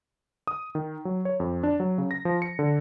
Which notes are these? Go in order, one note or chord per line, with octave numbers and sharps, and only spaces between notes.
D#6
D#3
F#3
C#5
F2
D4
F#3
C#3
A#6
F3
C#7
D3